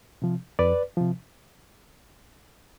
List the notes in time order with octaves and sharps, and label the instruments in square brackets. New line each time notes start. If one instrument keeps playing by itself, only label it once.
[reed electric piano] C3 F3
F2 B4 D5
C3 F3